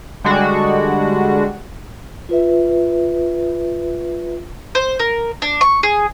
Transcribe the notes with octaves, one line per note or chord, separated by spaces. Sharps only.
D3 G3 G#3 D4 F#4
F4 B4 E5
C5
A#4
D4
C#6
G#4